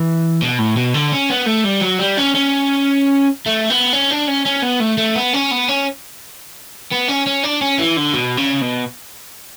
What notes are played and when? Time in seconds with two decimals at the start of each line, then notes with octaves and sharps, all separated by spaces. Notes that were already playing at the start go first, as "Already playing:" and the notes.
Already playing: E3
0.42 B2
0.59 A2
0.77 B2
0.94 D3
1.12 C#4
1.30 B3
1.47 A3
1.65 G3
1.82 F#3
1.99 G3
2.18 C#4
2.35 C#4
3.46 A3
3.70 B3
3.93 C#4
4.11 D4
4.28 C#4
4.46 C#4
4.63 B3
4.80 A3
4.98 A3
5.15 B3
5.33 C#4
5.51 B3
5.68 C#4
6.91 B3
7.08 C#4
7.26 C#4
7.43 D4
7.61 C#4
7.79 E3
7.97 D3
8.13 B2
8.37 C#3
8.61 B2